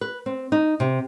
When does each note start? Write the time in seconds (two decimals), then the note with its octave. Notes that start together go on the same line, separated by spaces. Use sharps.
0.01 B4
0.26 C4
0.52 D#4
0.80 C3